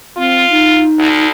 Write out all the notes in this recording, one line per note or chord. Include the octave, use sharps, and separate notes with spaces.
C4 F4
D#4
D2